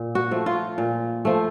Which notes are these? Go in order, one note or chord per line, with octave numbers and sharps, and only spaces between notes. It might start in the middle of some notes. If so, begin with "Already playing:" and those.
Already playing: A#2
F#4
F3 A3
F4
A#2
F3 A3